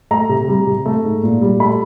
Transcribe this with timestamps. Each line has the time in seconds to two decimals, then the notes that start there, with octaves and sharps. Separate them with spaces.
0.11 A3 A#5
0.29 C3
0.48 G3
0.67 C3
0.86 A3
1.04 G#2
1.23 A#2
1.42 G3
1.60 A3 B5